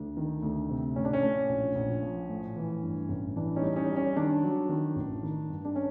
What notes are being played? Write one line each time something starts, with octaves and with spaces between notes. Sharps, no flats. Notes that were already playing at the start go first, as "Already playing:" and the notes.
Already playing: D2 D4
D#3
D2
C3
A2 C#4
D4
C#4
A2
A#1
A#1
F3
A2
E3
G2
A1
E3 D4
C#4 D#4
G3
C#4 D#4
G3
C#4
D#3 D4
F#3
D#3
A1
D#3
G2
D4
C#4